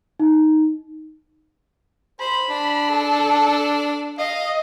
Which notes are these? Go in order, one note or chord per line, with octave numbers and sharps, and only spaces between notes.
D#4
C5 B5
D4
A4
D#5 F5